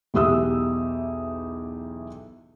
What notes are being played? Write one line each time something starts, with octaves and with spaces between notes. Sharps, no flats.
B1 E2 G4 E5 D#6 E6